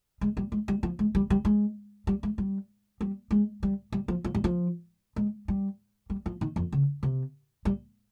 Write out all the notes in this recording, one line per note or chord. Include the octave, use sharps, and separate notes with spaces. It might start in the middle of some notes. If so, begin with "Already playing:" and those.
G#3
G3
G#3
G3
F3
G#3
G3
G3
G#3
G3
G#3
G3
G3
G#3
G3
G3
F3
F3
G3
F3
G#3
G3
G3
F3
D#3
F2
C#3
C3
G3